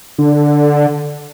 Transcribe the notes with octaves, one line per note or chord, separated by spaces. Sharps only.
D3